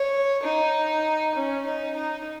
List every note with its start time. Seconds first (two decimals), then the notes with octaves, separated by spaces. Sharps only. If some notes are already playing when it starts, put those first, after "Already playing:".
Already playing: C#5
0.43 D#4
1.35 C#4
1.65 D#4
1.96 D#4